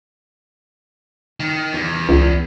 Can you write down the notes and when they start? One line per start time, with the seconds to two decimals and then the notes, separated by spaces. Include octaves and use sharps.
1.40 D#3
1.73 E2
2.09 C#2